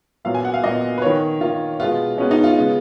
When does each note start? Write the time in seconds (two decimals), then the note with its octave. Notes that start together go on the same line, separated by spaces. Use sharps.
0.25 A#2 F#3 B3 F5
0.35 G#5
0.45 F#5
0.54 F5
0.63 A#2 F#3 B3 D#5
0.98 B4
1.02 D#3 A#3 C#5
1.41 D#3 A#3 F4
1.80 B2 G#3 B3 F4
2.17 B2 G#3 B3 C#4
2.31 D#4
2.44 F4
2.57 C#3 G#3 B3